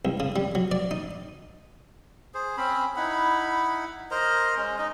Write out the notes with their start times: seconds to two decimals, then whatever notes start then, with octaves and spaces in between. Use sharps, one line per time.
0.05 C2
0.20 C#3
0.36 G3
0.55 F#3
0.71 D5
0.91 D#4
2.34 G#4 C5
2.57 C4 C#4 B5
2.96 D#4 E4 F#5 B5
4.11 A#4 C5 D#5 A#5
4.57 G#3 C#4
4.78 D#4 D#5